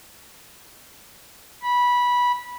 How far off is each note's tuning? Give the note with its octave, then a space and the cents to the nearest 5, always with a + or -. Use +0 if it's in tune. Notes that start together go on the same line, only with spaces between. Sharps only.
B5 -15